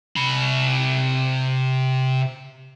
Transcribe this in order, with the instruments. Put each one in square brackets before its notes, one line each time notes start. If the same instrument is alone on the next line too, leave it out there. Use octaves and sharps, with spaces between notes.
[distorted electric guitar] C3 B5